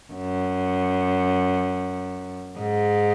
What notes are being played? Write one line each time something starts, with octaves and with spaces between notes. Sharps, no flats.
F#2
G#2